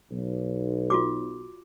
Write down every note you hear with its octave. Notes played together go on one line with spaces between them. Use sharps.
B1
F4 F#4 D6